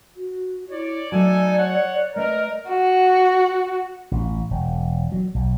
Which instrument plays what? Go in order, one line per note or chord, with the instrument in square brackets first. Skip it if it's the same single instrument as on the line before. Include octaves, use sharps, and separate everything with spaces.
[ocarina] F#4
[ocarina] E4 [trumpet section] C#5 D5
[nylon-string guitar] F#3 A3 [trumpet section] D#4 A4 G#5 [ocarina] D5
[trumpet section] C#5 F#5
[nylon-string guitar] A3 B4 D5 [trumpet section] A#4 [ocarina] D#5
[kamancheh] F#4
[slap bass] A1
E1
F#3
B1